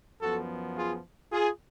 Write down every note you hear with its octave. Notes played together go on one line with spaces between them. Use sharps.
F#2 F3 B3 F#4 A4
F4 G#4
F4 G#4